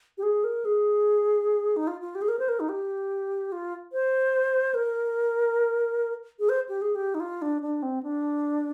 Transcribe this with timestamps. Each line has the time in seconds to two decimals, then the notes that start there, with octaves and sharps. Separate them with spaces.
0.18 G4
0.23 G#4
0.44 A#4
0.65 G#4
1.76 D#4
1.87 F4
2.01 F4
2.15 G4
2.22 G#4
2.28 A#4
2.39 C5
2.48 A#4
2.60 D#4
2.69 G4
3.52 F4
3.93 C5
4.74 A#4
6.39 G#4
6.49 C5
6.69 G4
6.82 G#4
6.95 G4
7.15 D#4
7.20 F4
7.42 D4
7.62 D4
7.82 C4
8.03 D4